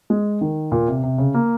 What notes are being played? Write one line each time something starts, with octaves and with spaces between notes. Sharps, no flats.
G#3
D#3
A#2
C3
C3
C#3
A#3